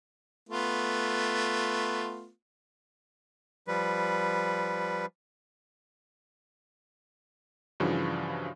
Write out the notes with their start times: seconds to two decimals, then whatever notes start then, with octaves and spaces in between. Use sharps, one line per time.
0.49 A3 B3 F4
3.67 F3 G3 B4
7.80 G2 C#3 E3 F3 F#4